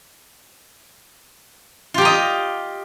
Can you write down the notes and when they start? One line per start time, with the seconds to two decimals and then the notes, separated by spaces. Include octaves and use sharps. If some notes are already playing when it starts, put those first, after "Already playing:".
1.94 F4
1.98 G4
2.01 A#5
2.05 D#5